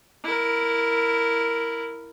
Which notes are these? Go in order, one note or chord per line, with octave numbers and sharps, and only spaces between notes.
E4 A#4